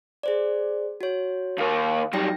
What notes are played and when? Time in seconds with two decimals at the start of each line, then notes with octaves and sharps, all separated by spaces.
0.23 G#4 C5 D5
1.01 F#4 C#5
1.58 D#2 A#3 F5
2.13 F#2 G3 D#4 G5 A#6